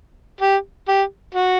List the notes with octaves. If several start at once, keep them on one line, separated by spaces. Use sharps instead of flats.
G4
G4
F#4